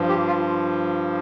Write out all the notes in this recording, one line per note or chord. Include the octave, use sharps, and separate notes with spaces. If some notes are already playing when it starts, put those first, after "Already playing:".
Already playing: G2 F3
G4
F4